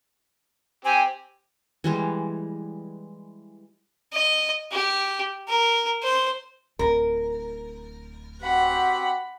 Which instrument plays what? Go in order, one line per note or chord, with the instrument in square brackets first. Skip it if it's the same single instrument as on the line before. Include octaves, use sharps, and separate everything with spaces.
[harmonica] C4 G4 [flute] G#5
[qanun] E3 G3 G#3
[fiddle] D#5
G4
A#4
C5
[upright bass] D1 F4 [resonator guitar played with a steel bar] A#4
[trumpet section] C4 F#4 G4 [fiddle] F#5 B5